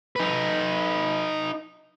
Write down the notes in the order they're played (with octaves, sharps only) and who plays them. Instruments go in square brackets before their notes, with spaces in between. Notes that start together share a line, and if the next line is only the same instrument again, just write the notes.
[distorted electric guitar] D#4 B4